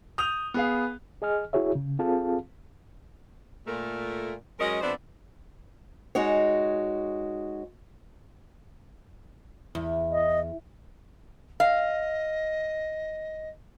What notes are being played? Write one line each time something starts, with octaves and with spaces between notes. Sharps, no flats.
D#6 G6 F7
B3 G#4 F5
G#4 D#5 G#5 F6
E4 F#4 G#4 C#5 E5
C#3
C4 F4 G#4 A4 F5 A5
A#2 A3 A#4
F#3 G#3 C#4 A#4 D#5
F2 B3 D4 C5 D5 E5
G#3 D#4 F#4 C#5
E2
D#5
D#5 F5